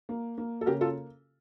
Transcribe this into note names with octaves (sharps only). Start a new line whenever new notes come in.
A#3
A#3
A4
C#3 G4 A#4
F4 A4